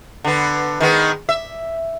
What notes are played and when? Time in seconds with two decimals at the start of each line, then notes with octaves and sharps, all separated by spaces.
0.24 D3 B3
0.80 D#3 G#3 B3
1.29 E5